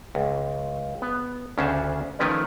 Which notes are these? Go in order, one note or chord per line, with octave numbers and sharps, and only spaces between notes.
C#2
B3
D2 C#3 C#4 D4 C5 A5
D#3 F3 A3 C#4 B4 D5